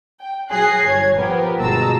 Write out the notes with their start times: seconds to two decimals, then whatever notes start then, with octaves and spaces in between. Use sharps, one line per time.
0.20 G5
0.51 F#3 G#4 G#5 F#6 A#6 C7
0.84 G1 C#5 G#6
1.16 F3 B3 G4 A#4
1.59 G1 B2 G#3 A5 A#5 E6